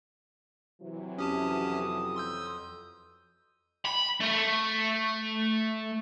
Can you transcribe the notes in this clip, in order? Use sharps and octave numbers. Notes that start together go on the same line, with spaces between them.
C3 E3 F#3
F2 C#4 G4 A5 D#6
C6 E6 G6
B5
A3